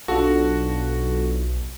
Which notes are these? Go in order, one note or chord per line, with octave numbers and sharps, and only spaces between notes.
B1 D4 F4 F#4 A4